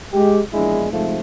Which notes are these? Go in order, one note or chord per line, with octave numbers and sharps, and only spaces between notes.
G#3 G4
A#1 E2 G#3 D4 E4
G#2 C3 F3 A3